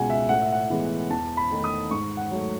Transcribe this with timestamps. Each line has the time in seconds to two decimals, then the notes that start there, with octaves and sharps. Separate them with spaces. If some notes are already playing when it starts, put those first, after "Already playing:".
Already playing: C#2 B2 G#3 F#5 G#5
0.10 E5
0.29 A2 F#5
0.42 E5
0.53 F#5
0.70 E3 G#3 B3
1.10 E2 A5
1.37 B5
1.51 D#3 A3 D#4
1.64 D#6
1.91 G#2 C#6
2.17 F#5
2.31 F#3 A3